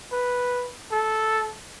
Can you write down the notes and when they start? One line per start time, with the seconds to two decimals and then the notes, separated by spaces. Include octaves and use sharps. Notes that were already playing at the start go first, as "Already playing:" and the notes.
0.12 B4
0.92 A4